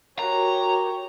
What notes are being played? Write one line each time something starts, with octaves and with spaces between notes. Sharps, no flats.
F#4 G4 A#4 C#5 A#5